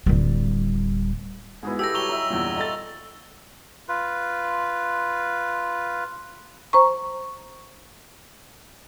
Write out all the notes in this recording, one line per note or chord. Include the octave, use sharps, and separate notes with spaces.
D1 G3
G#2 B3 E4 F#4 G#4
G4 A4 B4 E6 A#6
F#3 G3 C#6 F7 G7
D#4 E5
E2 G2 A#2
F4 A4 D#5 A6
F4 B4
C5 A#5 C#6